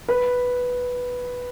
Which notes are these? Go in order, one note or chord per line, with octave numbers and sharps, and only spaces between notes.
B4